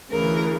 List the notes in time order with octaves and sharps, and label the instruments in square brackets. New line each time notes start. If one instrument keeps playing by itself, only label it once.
[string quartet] D2 C#3 E3 A#4